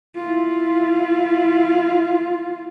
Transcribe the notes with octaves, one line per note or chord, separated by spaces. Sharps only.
E4 F4